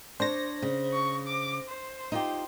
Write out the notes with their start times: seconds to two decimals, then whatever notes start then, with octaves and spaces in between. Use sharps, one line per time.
0.20 D4 C5 C#5 A#6
0.62 C#3
0.93 C#6
1.27 D6
1.69 C5
2.12 D#4 F4 G4